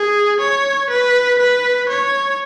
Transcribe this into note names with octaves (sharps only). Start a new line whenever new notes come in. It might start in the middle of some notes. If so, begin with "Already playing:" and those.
Already playing: G#4
C#5
B4
B4
C#5